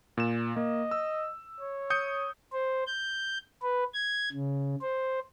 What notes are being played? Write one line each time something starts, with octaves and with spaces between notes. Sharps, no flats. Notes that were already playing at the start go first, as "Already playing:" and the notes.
A#2 E7
A#3 D#5
E6
C#5
D#6 G6 C#7
C5
G6
B4
G#6
C#3
C5